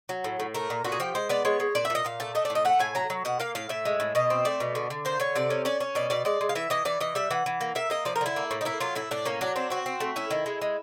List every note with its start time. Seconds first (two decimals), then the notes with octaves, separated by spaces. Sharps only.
0.09 F#3
0.24 A2
0.40 A2
0.54 A3 A#4
0.70 A#2
0.85 A#2 F#4
0.92 G#4
1.00 F3 G4
1.15 G#3 C5
1.29 B3 D5
1.45 G#3 C#5
1.60 G#3
1.75 A#2 D5
1.85 E5
1.90 A#2
1.95 D#5
2.05 A#2 F5
2.20 A3 A5
2.35 A3 D#5
2.45 D5
2.50 A2
2.55 D#5
2.65 A3 F#5
2.80 A2 G#5
2.95 F#3 A#5
3.10 F#3
3.25 B2 F#5
3.40 A#3 F5
3.55 A2 F5
3.69 A2 E5
3.85 G#3
4.00 A2
4.15 B2 D#5
4.30 C4
4.45 A3 D5
4.60 B2
4.75 D3
4.90 D3
5.05 A#3 C5
5.20 D3 C#5
5.35 C3 D5
5.50 C#4
5.65 C#4 D5
5.80 C#4
5.95 B2 D5
6.10 B2 D5
6.25 G#3 D5
6.41 G#3
6.49 F5
6.55 E3 E5
6.70 E3 D#5
6.85 E3 D5
7.00 E3 D#5
7.15 G3 E5
7.31 E3 F#5
7.46 E3
7.61 A#3
7.75 A#3 E5
7.90 A#3 D#5
8.05 F3 D5
8.16 A#4
8.21 D3 E4
8.36 A#3
8.51 A2
8.61 D#4
8.65 A#3 E4
8.80 F#3 F4
8.95 A2 E4
9.11 A2 D4
9.25 A#3 C#4
9.41 F#3 D4
9.56 C4 D4
9.70 C4 F#4
9.86 C4
10.00 A3
10.16 C#4 E4
10.31 D#3
10.46 G#3
10.61 G#3